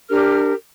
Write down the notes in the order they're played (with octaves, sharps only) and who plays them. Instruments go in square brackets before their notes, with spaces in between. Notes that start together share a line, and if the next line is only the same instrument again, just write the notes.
[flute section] D4 G4 A#4 F6